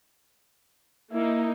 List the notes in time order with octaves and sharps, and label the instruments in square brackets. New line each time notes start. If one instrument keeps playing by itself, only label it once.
[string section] A#3 D#4 [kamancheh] E4